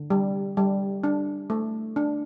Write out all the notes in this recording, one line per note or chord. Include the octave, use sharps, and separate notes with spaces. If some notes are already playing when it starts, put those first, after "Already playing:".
Already playing: D3
G3
G3
D4
A3
D4